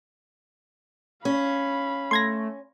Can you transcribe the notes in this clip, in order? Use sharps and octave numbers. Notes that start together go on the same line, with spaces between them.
C#4 F5 B5
A3 C6 G#6 A#6